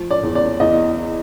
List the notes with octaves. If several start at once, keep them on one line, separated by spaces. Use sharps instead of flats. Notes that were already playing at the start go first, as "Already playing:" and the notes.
Already playing: F3
D5
E2
D5
E2 D#5